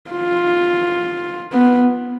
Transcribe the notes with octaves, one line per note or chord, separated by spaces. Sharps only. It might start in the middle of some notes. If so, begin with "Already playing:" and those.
F4
B3